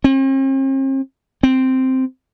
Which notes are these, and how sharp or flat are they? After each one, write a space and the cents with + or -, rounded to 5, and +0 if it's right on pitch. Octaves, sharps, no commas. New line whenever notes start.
C4 +45
C4 -5